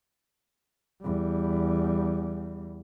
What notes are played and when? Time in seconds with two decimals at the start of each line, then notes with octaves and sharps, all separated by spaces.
1.02 E2 G3